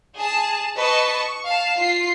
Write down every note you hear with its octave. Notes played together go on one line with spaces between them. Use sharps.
G#4 A5
B4 D#5 A5 C#6
C#6
F5 A5
F4 C7